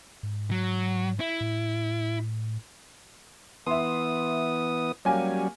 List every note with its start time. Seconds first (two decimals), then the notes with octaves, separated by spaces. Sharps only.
0.23 G#2
0.51 F#3
1.20 E4
1.41 A2
3.67 E3 B3 E5 C6 D#6
5.05 F#3 G3 A#3 C#4 G4 G#5